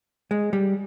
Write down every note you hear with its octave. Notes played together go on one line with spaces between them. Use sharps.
G#3
G3